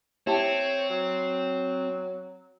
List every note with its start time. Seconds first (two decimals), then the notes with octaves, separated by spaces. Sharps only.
0.27 C4 E4 G4 C#5 A5
0.89 F#3